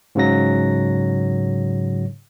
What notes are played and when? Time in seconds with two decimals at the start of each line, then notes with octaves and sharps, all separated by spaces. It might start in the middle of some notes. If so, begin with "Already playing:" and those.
0.15 G#2 C#3 F#3 A#6